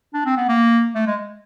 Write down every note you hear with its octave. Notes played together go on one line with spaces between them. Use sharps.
D4
C4
B3
A#3
A3
G#3